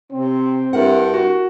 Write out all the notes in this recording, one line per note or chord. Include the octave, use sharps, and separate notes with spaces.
C3 C4
G2 E4 A#4 F#5
F#4